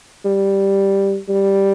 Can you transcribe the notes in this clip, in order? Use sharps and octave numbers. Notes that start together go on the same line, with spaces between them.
G3
G3